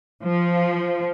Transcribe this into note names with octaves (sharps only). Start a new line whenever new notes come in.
F3